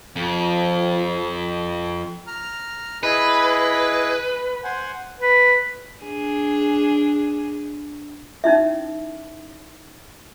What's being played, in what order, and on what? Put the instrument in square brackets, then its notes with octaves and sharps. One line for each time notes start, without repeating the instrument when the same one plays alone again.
[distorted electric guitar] F2 [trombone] F3
[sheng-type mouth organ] A#5 F6
[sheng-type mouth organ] E4 G#4 D#5 [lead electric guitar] B4
[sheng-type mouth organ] C5 F#5 G#5
[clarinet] B4
[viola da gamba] D4 G#4
[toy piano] C#4 D#4 E4 E5